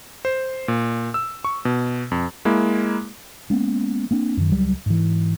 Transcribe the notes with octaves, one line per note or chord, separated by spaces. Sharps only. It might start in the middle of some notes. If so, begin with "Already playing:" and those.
C5
A#2
E6
C#6
B2
F2
G#3 A#3 E4
G#3 A#3 B3 C#4
A#3 C4 D4
F#2 D#3
C#2 F#3 G3
G#2 E3